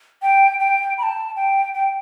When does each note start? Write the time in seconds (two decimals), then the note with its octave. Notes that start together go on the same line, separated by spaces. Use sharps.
0.22 G5
0.59 G5
0.98 B5
1.03 A5
1.36 G5
1.74 G5